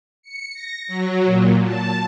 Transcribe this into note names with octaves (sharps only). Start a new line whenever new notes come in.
C#7
A#6
F#3
A#2
A5